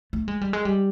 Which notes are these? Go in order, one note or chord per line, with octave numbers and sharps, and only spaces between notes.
A3
G#3
G3
G#3
G3